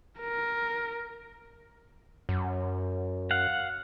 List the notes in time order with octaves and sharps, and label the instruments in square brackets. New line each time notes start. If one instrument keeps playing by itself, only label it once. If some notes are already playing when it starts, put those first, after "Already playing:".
[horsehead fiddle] A#4
[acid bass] F#2
[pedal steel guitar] F5 F#5